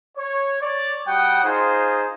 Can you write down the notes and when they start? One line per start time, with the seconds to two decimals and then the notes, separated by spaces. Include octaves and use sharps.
0.18 C#5
0.62 C#5 D5
1.07 G3 F#4 F#5 G5 D#6
1.45 D#4 F4 G#4 C5